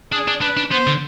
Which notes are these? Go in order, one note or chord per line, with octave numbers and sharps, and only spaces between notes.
D4 G#4
D4
D4 B4
D4
B3 C5
D3